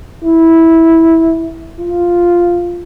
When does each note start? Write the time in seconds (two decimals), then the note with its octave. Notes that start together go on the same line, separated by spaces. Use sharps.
0.24 E4
1.80 F4